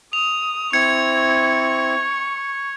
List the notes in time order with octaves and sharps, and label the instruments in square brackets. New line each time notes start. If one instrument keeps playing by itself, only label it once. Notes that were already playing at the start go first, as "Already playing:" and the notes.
[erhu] D#6 [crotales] F7
[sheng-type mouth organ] C4 E4 [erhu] C#6 [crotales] G#6 C#7